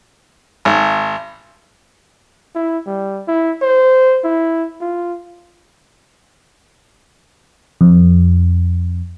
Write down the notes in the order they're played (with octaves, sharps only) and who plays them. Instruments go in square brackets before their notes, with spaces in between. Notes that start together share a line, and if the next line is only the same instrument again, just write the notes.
[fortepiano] G#1
[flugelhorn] E4
G3
E4
C5
E4
F4
[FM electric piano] F2